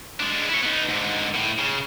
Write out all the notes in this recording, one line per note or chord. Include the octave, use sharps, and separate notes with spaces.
G#3 D4
E4 C#5
B3 D#4
G#2 D3
A2
C#3